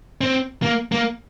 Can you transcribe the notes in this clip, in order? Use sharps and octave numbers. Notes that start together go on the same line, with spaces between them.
C4
A#3
A#3